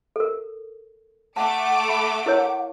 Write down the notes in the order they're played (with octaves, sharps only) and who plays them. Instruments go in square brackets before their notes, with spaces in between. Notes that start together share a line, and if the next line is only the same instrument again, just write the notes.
[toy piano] A4 A#4
[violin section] A3 D6 D7 [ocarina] F#5 [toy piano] A5
[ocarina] F#5 [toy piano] B5
[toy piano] E4 A#4 C#5